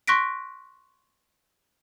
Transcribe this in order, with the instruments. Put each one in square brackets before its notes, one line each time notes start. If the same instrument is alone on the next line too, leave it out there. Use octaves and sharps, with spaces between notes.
[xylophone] C6 C#6 F#6 A#6 B6 D7